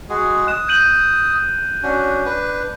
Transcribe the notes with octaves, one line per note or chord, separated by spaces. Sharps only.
G#3 F#4 G#4
D#6 F#6 E7
G6 D#7 F#7
C#4 D4 F#4
D4 B4